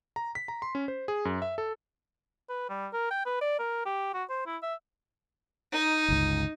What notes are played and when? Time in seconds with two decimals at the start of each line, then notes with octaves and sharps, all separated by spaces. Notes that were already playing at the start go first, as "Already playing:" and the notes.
0.16 A#5
0.35 B6
0.48 A#5
0.62 C6
0.75 C#4
0.88 C5
1.08 G#4
1.25 F#2
1.42 E5
1.58 A4
2.49 B4
2.70 G3
2.93 A#4
3.11 G5
3.26 B4
3.41 D5
3.59 A#4
3.86 G4
4.14 F#4
4.30 C5
4.47 E4
4.63 E5
5.72 D#4
6.08 G1 C#2